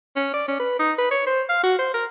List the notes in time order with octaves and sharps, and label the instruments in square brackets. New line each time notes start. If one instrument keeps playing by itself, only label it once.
[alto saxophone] C#4
D5
C#4
B4
D#4
B4
C#5
C5
F5
F#4
C5
A#4